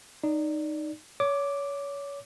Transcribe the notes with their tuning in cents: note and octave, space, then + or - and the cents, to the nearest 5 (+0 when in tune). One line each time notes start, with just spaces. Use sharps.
D#4 -15 D5 -10
C#5 +25 D6 +0